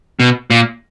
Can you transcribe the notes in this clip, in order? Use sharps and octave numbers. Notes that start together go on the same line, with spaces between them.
B2
A#2